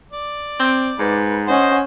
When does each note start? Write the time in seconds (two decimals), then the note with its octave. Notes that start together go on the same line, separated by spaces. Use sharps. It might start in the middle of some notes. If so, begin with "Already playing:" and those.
0.13 D5
0.59 C4
0.99 G#2 B4
1.48 C#4 C5 D#5 F#5